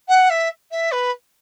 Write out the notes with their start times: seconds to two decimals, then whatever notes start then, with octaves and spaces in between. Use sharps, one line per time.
0.08 F#5
0.29 E5
0.71 E5
0.91 B4